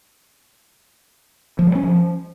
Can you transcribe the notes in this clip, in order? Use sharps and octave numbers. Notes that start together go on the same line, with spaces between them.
F3
G3
C#4
F3